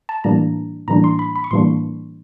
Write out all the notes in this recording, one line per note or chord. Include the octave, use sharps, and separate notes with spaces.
A5
A2 E3 G3 A#3 D4 A#5
A2 E3 G3 A#3 D4 A#5
C6
B5
B5
C#6
A2 E3 G3 A#3 D4 C6